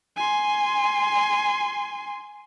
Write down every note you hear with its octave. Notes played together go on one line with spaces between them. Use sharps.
G#5 C6